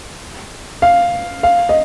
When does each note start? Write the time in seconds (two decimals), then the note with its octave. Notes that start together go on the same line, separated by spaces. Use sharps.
0.82 F5
1.43 F5
1.69 D#5